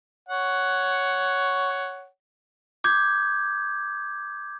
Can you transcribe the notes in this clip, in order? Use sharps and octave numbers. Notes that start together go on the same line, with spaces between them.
C#5 F#5
D6 G6 G#6